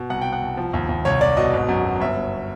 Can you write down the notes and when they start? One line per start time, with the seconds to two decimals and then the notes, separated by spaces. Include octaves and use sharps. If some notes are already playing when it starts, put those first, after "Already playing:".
Already playing: B2
0.10 C2 F#5
0.22 C2 G5
0.33 F#5
0.42 C2
0.57 F3
0.73 D#2
0.89 D#2
1.05 C2 C#5
1.21 C2 D5
1.37 B2 D#5
1.53 G#1
1.69 F#2
1.84 F#3
2.00 G1 E5
2.16 G1